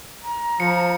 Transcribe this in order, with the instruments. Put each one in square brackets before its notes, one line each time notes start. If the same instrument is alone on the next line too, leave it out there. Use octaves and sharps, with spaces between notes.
[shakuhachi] A#5
[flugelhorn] F3 [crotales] C#7